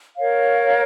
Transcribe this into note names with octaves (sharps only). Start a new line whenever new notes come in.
A#4 C#5 F5